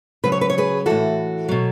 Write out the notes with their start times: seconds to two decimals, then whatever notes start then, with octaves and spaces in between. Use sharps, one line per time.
0.24 C#3 F#3 B4
0.32 C#5
0.41 B4
0.50 C#5
0.58 G#4 B4
0.86 A2 E3 F#4 A4
1.48 B2 F#3